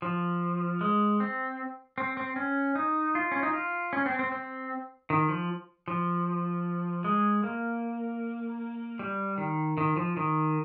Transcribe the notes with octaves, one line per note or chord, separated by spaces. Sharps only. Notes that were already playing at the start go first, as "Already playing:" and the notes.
F3
G#3
C4
C4
C4
C#4
D#4
F4
C#4
D#4
F4
C#4
C4
C4
C4
D#3
F3
F3
G#3
A#3
G3
D#3
D#3
F3
D#3